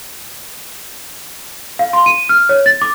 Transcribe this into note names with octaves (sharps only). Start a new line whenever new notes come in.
F5
C6
D#7
F6
C#5
A6
D6